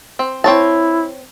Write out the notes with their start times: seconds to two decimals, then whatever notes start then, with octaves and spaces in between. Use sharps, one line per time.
0.19 C4
0.44 C4 E4 C#5 A5